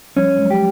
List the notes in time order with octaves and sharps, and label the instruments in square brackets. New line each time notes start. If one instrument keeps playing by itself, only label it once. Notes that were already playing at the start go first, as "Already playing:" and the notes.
[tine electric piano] F3 G3 [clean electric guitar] C#4
[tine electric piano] F#3 G#3
[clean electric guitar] G4